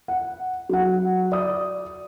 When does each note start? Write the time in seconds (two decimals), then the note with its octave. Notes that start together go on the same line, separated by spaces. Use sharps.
0.08 F#5
0.69 F#3 F#5
1.32 D5 D#6